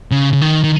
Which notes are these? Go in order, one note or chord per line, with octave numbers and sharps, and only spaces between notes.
C#3
C#3
D#3
D#3